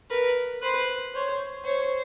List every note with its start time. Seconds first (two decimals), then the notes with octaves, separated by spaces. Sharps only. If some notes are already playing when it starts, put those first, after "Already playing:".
0.10 A#4 B4
0.62 B4 C5
1.14 C5 C#5
1.65 C5 C#5